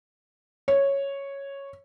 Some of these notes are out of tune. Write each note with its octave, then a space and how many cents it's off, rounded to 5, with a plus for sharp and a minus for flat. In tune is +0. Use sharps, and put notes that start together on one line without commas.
C#5 -5